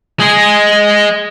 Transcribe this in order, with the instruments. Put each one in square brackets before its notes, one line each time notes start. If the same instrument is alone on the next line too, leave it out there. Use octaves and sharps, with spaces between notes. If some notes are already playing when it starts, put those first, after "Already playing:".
[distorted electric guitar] G#3 G#4